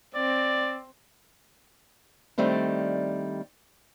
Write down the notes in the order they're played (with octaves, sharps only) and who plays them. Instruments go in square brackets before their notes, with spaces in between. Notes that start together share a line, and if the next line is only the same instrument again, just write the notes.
[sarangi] C4 [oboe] D5
[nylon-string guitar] D#3 G3 A3 C4 D4